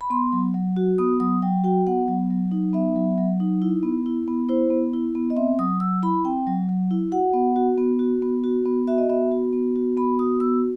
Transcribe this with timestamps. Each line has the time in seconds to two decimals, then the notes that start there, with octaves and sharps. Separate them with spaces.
0.01 B5
0.10 B3 C6
0.32 F#3
0.54 F#3
0.77 F#4
0.98 B3 D#6
1.20 F#3 D#6
1.42 F#3 G5
1.64 F#4 G5
1.87 B3 F#5
2.08 F#3
2.31 F#3
2.51 D#4
2.73 B3 E5
2.96 F#3
3.18 F#3
3.40 D#4
3.62 E4
3.83 B3
4.06 E4
4.28 B3
4.49 E4 C5
4.70 B3
4.94 E4
5.15 B3
5.30 D#5
5.36 C4 E5
5.59 F#3 D#6
5.80 F#3 E6
6.03 E4 B5
6.24 C4 G5
6.47 F#3
6.69 F#3
6.91 E4
7.12 F#4 F#5
7.33 B3
7.56 F#4
7.78 B3
7.99 F#4
8.22 B3
8.44 F#4
8.66 B3
8.87 F#4 E5
8.98 D#5
9.09 B3 E5
9.31 F#4
9.53 B3
9.76 F#4
9.97 B3 B5
10.19 F#4 D#6
10.40 B3 E6